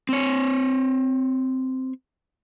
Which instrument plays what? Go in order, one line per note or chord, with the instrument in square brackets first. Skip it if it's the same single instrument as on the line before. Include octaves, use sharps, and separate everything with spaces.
[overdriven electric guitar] C4 C#5